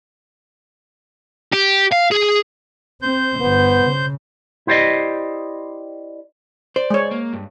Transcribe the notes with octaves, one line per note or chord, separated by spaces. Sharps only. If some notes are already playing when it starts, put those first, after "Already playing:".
G4
F5
G#4
C4 C5 G6
G1 B3
C#3
E4 G4 C5 D5 D#5
C5 D5
G#3 C#5
A#3
G2